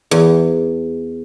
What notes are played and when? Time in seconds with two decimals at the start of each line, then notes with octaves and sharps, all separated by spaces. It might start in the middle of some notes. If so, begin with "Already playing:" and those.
0.11 E2